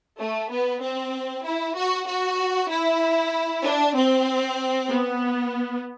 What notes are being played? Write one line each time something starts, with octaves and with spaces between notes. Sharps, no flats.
A3
B3
C4
E4
F#4
F#4
E4
D4
C4
B3